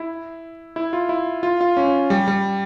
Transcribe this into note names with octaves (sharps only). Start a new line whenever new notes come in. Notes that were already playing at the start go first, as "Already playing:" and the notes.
Already playing: E4
E4
F4
E4
F4
F4
C#4
G3
G3